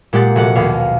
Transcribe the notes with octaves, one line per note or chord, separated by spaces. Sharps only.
A#2 G#3 G4 F#5 A6
F1 F#4 F#5 D6
A#1 D#2 B2 C#4 F5